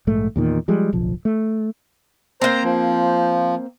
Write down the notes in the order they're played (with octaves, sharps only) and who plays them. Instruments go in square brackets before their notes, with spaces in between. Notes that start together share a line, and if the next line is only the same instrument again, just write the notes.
[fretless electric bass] A#1 G#2 A3
E2 A#2 D#3
F3 G3 G#3
D1 B1 F3
A3
[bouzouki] A#3 C4 [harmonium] C5 A#5
[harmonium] F3